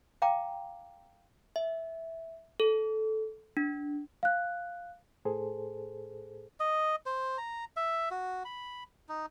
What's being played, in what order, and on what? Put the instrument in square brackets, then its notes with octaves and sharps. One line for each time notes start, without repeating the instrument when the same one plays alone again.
[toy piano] F5 G5 A#5 D6
[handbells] E5
A4
D4
[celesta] F5 F#6
[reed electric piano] A2 G#4 A4 C5
[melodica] D#5
C5
A#5
E5
F#4
B5
D#4